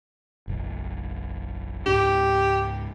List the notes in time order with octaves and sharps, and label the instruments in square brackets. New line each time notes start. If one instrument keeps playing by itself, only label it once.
[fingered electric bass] F#1 B1
[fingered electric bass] C#2 G#2 D4 [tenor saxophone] G4